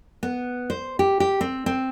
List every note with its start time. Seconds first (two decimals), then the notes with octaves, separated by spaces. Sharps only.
0.23 B3
0.70 C5
0.99 G4
1.20 G4
1.41 C4
1.66 C4